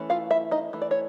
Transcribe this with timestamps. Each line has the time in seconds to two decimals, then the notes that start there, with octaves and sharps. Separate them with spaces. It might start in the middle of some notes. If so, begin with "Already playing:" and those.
Already playing: E3 A3 C#4
0.10 F4 F5
0.31 E4 E5
0.51 D#4 D#5
0.73 E3 A3
0.82 D5
0.91 C#5